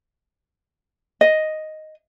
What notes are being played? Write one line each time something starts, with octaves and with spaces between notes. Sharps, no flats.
D#5